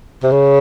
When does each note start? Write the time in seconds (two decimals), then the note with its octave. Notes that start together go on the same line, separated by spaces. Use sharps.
0.23 C3
0.32 C#3